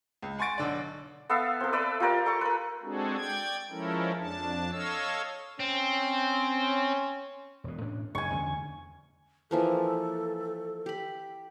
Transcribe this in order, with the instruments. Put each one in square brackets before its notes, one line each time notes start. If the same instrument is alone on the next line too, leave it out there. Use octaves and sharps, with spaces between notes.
[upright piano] C#2
F#5 G#5 C6 C#6 A6 D7
B1 D3 D5
[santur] B3 A4 E5 F5
C4 A4
B4 D5 E5
F4 G4 A#4 D5
A4 C#6
A#4 B4
[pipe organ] G#3 C4 D4 F#4 G#4 A4
D5 G5 G#6
F3 G#3 C#4 E4 A4 A#4
F2 D4 A5
A4 C#5 D#5 F5 E6
[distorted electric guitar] C4 [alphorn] C#4
[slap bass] E1 B2
A2 C#4 D4
[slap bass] F#1 G2 [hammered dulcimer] G#5 C#6
[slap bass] E2 D3 C#4
[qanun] E3 F3 A#3 [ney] A4
[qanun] G4 B5